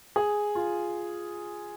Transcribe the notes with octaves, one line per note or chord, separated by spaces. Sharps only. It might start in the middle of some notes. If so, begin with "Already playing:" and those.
G#4
F4